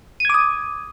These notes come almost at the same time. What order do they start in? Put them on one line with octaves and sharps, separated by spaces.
D#7 G#6 D6 D#6